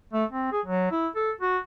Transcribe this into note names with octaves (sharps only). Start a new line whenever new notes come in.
A3
C4
G#4
F#3
E4
A4
F#4